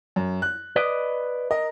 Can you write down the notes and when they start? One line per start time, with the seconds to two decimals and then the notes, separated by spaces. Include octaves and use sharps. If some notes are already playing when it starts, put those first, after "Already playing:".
0.16 F#2
0.42 F#6
0.76 B4 D5 D#5
1.51 A#4 D#5